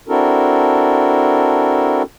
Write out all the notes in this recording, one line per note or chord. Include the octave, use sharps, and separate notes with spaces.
C4 D4 E4 F#4 A4 A#4